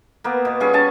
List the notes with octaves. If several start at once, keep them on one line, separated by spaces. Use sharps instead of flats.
A#3 B3
B2
G3 C#4 F4 G#4
C#4 C#5 G#5 A5